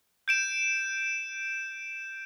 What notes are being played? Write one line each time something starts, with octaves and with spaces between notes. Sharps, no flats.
G6 D7 E7